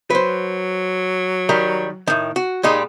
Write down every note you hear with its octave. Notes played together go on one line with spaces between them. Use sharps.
F#3 B4 C5
D#3 G3 A#4
A2 D#3
F#4
A#2 G3 G#3 D#4